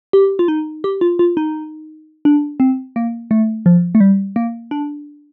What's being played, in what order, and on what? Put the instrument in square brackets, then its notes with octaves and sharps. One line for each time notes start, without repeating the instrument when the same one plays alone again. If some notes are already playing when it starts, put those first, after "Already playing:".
[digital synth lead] G4
F4
D#4
G4
F4
F4
D#4
D4
C4
A#3
A3
F3
A3
G3
A#3
D4